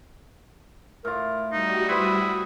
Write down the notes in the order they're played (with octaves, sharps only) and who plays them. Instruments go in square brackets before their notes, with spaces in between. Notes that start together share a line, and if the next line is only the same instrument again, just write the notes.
[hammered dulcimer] A2 F4 [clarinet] A#4
[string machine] G3 F#4 [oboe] D#4
[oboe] E4 [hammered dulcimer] B4 C5 [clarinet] D#6